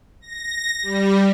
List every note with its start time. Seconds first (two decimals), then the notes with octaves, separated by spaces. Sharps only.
0.21 A#6
0.83 G3